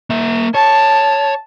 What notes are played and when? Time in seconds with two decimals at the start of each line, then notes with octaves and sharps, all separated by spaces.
0.10 A#3 E5
0.55 C#5 A5